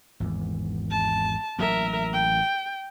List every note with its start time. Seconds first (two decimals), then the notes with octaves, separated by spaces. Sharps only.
0.20 G#1 E2
0.91 A5
1.59 A1 F#3 A#3 A#4 E5
2.13 G5